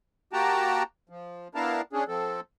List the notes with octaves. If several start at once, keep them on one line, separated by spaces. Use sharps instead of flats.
A#3 F#4 G4 G5 A5 A#5
F3
B3 D4 E4 A#4 F5 A5
C#4 D4 G#4
F3 C4 A4